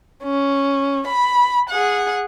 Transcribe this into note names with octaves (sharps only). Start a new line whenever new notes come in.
C#4
B5
G#4 F#5